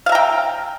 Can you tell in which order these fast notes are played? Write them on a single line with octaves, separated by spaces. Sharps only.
F5 E5 A#5 G5